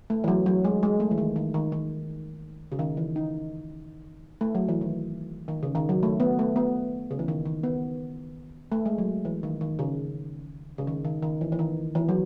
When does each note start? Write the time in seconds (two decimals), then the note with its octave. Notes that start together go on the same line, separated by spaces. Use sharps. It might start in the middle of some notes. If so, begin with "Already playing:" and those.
0.10 A3
0.24 E3
0.28 F#3
0.46 F#3
0.65 G#3
0.83 G#3
1.00 A3
1.11 E3
1.18 D#3
1.36 D#3
1.54 D#3
1.72 D#3
2.72 C#3
2.79 D#3
2.97 E3
3.16 D#4
4.41 A3
4.55 F#3
4.68 E3
4.81 D#3
5.48 D#3
5.63 C#3
5.75 D#3
5.89 F#3
6.03 A3
6.20 B3
6.39 A3
6.56 B3
7.11 C#3
7.19 E3
7.28 D#3
7.46 D#3
7.63 B3
8.72 A3
8.86 G#3
8.98 F#3
9.25 E3
9.43 D#3
9.61 D#3
9.79 C#3
10.78 C#3
10.87 D#3
11.05 D#3
11.22 D#3
11.41 E3
11.52 E3
11.59 D#3
11.95 E3
12.09 F#3